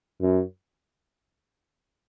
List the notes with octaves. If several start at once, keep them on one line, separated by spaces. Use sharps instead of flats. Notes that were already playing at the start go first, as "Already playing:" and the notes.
F#2